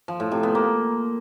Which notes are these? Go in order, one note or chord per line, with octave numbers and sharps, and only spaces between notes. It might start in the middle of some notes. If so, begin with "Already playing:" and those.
F3
A2
C3
B3
A#3